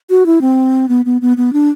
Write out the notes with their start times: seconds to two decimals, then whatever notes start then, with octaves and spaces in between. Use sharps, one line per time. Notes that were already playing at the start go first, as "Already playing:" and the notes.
0.10 F#4
0.26 E4
0.41 C4
0.89 B3
1.05 B3
1.21 B3
1.37 B3
1.53 D4